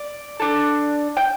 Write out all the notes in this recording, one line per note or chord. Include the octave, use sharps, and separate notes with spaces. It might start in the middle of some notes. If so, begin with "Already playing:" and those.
Already playing: D5
D4 A4
G5